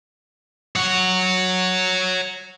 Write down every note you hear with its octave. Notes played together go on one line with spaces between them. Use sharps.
C#5 F#5